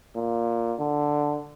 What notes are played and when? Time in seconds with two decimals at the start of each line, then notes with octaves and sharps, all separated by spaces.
0.16 A#2
0.80 D3